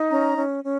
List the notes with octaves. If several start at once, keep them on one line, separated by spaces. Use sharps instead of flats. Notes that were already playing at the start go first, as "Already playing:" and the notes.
Already playing: D#4
C#4 A#5
C#4
C#4